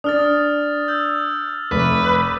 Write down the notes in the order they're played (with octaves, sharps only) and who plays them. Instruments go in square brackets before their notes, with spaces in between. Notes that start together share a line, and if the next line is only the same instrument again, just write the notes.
[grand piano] D4 [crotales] D#6 F6 A6
[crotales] E6 G6
[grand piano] F1 [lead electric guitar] B4 [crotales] D6